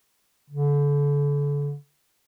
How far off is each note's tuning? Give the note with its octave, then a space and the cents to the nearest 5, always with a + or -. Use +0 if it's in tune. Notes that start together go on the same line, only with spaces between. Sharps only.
D3 -35